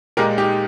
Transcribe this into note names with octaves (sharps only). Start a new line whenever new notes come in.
A#2 G#3 G4 A#4
D#4 G4